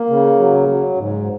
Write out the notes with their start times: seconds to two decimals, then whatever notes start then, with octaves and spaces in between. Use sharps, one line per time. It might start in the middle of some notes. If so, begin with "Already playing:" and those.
Already playing: A#3
0.10 C#3
0.39 F#3
0.68 F#3
0.98 G#2